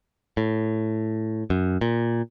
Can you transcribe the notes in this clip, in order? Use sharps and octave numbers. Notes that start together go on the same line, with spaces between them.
A2
F#2
A#2